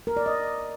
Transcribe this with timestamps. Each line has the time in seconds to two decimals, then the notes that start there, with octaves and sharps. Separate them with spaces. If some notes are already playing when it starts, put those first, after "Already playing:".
0.07 A#4
0.17 D5
0.26 D#5